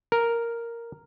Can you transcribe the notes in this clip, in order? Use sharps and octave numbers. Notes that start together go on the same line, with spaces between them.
A#4